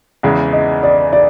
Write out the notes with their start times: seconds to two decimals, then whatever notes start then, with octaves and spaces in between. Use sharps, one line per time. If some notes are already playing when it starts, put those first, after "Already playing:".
0.23 E2 C#3 E3 G#3
0.53 D#5
0.83 D5
1.13 D5